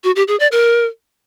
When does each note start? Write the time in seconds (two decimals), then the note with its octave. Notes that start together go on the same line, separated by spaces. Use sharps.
0.04 F#4
0.16 G4
0.28 G#4
0.40 D5
0.52 A#4